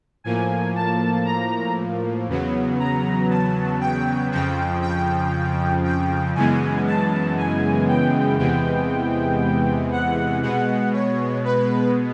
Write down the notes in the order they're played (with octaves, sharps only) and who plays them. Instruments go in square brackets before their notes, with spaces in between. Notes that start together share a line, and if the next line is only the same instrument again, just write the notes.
[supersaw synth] A2 F3 A#3 G#5
A5
A#5
E2 C#3 F#3 B3
A#5
A5
G5
F2 C#3 F3 G5
G5
G5
F#2 C#3 E3 G#3 B3 G#5
A5
G#5
G5
E2 C3 E3 G#3 B3 G5
F#5
B2 G#3 B3 F#5
C#5
B4